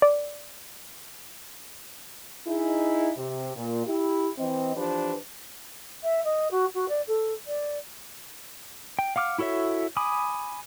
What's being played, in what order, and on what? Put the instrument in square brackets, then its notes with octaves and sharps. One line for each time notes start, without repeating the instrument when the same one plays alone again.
[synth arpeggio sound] D5
[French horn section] D#4 E4 G#4
C3
A#2
E4 G4
E3 C4 D#5
E3 F3 D4 G4 B4 C5
[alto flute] E5
D#5
F#4
F#4
D5
A4
D5
[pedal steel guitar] G5
F5 F#5 D6 F6
E4 F#4 A4 C#5 E5
G#5 B5 D6 D#6